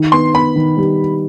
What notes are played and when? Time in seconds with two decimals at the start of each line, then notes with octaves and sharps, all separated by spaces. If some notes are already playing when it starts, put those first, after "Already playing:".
Already playing: D#3
0.12 B3 C6
0.34 B3 B5
0.56 D#3
0.77 G3